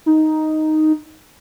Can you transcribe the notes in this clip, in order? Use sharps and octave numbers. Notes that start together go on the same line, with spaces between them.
D#4